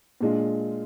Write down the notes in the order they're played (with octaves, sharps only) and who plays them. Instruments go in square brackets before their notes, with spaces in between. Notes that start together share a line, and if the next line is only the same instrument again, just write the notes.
[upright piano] A#2 G#3 D4 F4